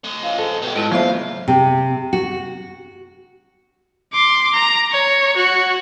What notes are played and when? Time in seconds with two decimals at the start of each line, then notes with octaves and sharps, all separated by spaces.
0.04 A3 D#5
0.23 E3 C#4 F4
0.38 G#2 A4
0.62 E2 B2 B3 G4
0.75 G#2 E4 F4 A4 D#5
0.92 F#1 B1 B3 D4 B4 C5 E5 F5
1.48 C3
2.13 F#4
4.13 C6 D6
4.54 A#5
4.92 C#5
5.36 F#4